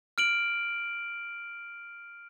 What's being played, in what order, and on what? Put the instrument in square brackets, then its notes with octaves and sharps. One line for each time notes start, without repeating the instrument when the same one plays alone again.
[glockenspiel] F6 D7 F#7